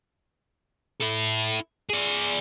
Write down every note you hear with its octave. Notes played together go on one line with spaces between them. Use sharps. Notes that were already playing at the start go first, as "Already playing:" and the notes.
E4 A4
G#4 D5